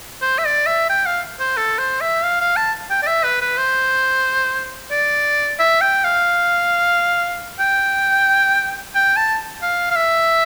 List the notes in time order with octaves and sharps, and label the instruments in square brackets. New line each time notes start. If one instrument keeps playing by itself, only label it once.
[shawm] C5
E5
D5
E5
G5
F5
C5
A4
C5
E5
F5
F5
A5
G5
D5
E5
B4
B4
C5
D5
E5
G5
F5
G5
G5
A5
F5
F5
E5